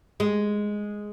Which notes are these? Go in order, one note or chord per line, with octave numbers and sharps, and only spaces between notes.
G#3